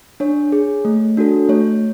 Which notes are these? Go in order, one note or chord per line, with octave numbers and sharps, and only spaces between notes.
D4 C#5
G#4
A3
D4 F#4 A4
A3 C#5